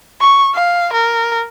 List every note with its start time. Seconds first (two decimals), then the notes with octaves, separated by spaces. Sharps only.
0.21 C#6
0.55 F5
0.93 A#4